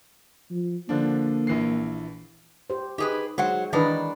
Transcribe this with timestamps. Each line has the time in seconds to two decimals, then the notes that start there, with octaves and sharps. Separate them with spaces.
0.50 F3
0.89 D3 F3 A#3 D4
1.47 A#1 E3 C7
2.70 G4 C5
2.98 D#4 G4 G#4 B4
3.38 F#3 G#3 C5 F#5
3.73 D#3 E3 D4 D#4 B4